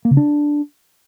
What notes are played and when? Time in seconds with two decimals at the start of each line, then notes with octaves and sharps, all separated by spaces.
0.05 A#3
0.11 C#3
0.17 D4